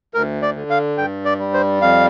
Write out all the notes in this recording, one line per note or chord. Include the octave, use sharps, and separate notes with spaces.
D2 A#4
D5
D3
F5
G2 G5
D5
G3
C5
F2 F5